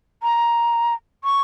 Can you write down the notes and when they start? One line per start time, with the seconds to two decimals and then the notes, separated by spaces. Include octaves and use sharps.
0.23 A#5
1.24 C#6